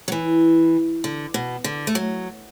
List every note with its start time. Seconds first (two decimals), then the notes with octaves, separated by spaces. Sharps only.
0.08 F#3
0.12 E3
1.04 D3
1.34 B2
1.64 D3
1.87 A3
1.95 F#3